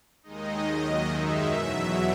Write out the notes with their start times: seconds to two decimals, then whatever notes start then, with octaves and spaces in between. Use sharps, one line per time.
0.23 D#2 D#3 G#3 D#4 D#5
0.64 D#2 D#3 F#3 D#5
1.04 F#2 D#3 G#3 D#4 E5
1.45 E2 B2 F#3